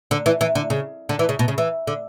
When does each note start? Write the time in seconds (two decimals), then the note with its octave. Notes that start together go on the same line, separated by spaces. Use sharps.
0.11 D3
0.26 E3
0.41 E3
0.55 D3
0.70 C#3
1.09 D3
1.19 E3
1.29 C#3
1.39 B2
1.48 C#3
1.58 E3
1.87 D3